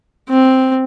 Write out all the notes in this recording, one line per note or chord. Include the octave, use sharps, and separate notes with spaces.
C4